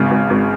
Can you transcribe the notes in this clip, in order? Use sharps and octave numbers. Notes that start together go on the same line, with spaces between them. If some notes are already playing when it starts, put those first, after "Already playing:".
Already playing: G#1 C#3
G#1
G#1